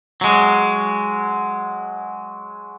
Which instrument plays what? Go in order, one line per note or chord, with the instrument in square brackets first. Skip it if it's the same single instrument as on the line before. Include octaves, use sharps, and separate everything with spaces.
[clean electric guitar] F#3 G#3